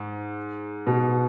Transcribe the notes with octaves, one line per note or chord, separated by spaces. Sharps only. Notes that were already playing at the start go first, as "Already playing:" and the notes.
Already playing: G#2
B2